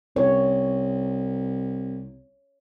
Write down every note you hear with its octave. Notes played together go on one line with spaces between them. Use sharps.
C2 C#5